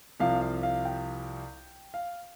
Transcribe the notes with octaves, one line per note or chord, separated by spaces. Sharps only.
C2 C3 F3 F5
F5
F5
G5
F5